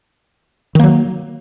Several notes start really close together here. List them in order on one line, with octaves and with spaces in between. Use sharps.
D#3 A#3 F#3